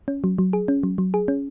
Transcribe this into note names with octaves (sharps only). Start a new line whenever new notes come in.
C#4
F#3
F#3
G#4
C#4
F#3
F#3
G#4
C#4